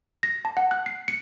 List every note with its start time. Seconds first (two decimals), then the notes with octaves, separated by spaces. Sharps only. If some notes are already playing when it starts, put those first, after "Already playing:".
0.23 A#6
0.45 A5
0.57 F#5
0.71 F#6
0.86 C7
1.08 C#7